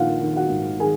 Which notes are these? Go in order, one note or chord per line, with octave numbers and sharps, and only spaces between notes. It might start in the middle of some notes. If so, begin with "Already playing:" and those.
Already playing: A#1 D#3 F4 F5 F#5
D#3
F#4 F#5
G#2
D#3 G#4 G#5